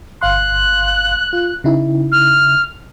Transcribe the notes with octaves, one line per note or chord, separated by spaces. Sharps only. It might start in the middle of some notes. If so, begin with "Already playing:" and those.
G1 F5 C6 F#6
F4
C#3 D#4 E4
F6